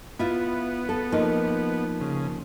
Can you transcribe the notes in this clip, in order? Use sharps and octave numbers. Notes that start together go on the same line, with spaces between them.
B3 E4 F4
A4
F3 A#3 D#4
C#3